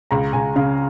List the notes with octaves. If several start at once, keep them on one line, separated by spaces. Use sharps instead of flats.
C#2 A#5
C#2 G#5
C#3 F5